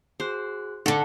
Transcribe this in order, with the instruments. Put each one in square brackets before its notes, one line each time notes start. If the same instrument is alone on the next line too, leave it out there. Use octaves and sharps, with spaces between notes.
[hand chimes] F#4 G#4 F#6 [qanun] C5
[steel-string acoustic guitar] G2 D3 [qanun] A4 A5 [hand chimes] F#5